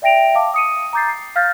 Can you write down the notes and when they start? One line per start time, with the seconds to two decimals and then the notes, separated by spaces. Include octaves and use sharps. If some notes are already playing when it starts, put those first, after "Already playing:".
0.02 D5 E5 G5 A#6 D7 F7
0.35 F5 A5 D6
0.54 D#6 C#7 D#7
0.93 A#5 D6 G6 A6 C7
1.08 C7
1.36 F5 F6 G6 A6 A#6